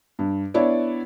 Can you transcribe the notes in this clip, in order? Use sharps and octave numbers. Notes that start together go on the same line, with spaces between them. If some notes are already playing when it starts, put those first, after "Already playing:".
G2
B3 D4 E4 C#5 D5